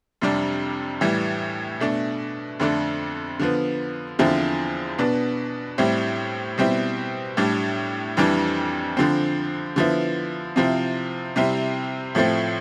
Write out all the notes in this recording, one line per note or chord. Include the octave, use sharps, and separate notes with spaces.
F2 C3 G3 D4
A2 E3 G3
B2 A3 D4
F2 D3 A3 D4
D3 F3 B3
E2 D3 F3 C4 E4
B2 B3 D4
A2 G3 C4 E4
B2 G3 C4 E4
A2 G3 D4
F2 E3 G3 D4
D3 F3 C4
D3 F3 B3 E4
C3 F3 C4 E4
C3 G3 C4 E4
A2 F3 A3 C4